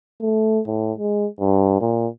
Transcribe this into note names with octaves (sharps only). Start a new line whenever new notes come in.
A3
A2
G#3
G2
A#2